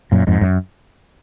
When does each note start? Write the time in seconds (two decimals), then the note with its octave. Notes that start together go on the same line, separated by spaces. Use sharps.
0.12 F#2 A#2
0.27 F2 G#2
0.41 F#2